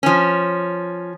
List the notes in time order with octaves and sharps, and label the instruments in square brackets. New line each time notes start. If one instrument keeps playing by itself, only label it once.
[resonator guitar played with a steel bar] F3 C#4